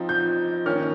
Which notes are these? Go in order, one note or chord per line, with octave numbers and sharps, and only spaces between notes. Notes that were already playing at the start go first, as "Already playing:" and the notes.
Already playing: F3 C4 D#4
G6
D#3 A#3 C#4 F6